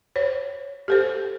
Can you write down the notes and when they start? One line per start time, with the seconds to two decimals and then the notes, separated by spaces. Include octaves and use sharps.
0.16 C5 C#5
0.88 G4 A4 C5